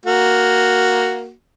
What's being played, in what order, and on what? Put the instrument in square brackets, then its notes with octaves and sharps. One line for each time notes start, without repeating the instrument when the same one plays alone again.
[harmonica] A#3 F#4